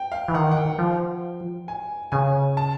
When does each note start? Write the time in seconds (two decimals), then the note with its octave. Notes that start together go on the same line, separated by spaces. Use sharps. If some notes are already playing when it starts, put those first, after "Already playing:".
Already playing: G5
0.12 F5
0.28 E3
0.34 D#3 F#5
0.51 F#5
0.57 G5
0.79 F3
1.68 G#5
2.12 C#3 G#5
2.57 A5